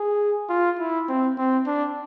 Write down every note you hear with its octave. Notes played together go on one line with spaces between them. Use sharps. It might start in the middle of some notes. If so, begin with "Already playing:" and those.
Already playing: G#4
F4
E4
C4
C4
D4